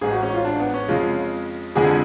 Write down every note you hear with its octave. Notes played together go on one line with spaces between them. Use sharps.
A1 G#2 G#3 G#4
F#4
C#4
F4
D4
B3
C#4
F2 C#3 G#3 F4
F2 D3 F3 G#3 G#4